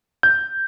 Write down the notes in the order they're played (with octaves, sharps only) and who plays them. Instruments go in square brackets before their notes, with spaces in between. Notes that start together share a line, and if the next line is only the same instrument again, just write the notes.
[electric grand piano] G6